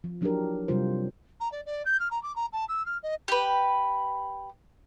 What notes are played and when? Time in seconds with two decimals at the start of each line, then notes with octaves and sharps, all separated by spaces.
0.04 F3
0.21 F3 F#3 D4 E4 G4 A#4
0.68 C3 F#3 G3 F4 C5
1.40 A#5
1.52 D5
1.66 D5
1.85 G6
2.00 F6
2.11 A#5
2.23 D6
2.36 A#5
2.53 A5
2.69 E6
2.86 F6
3.03 D#5
3.28 G4 B4